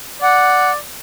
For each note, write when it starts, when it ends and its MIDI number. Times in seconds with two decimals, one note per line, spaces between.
0.22 0.76 74
0.22 0.72 78